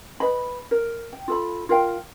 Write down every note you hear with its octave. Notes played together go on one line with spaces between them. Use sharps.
B4 D#5 B5
A#4
G5
F4 A4 B5
F4 A#4 F5 G5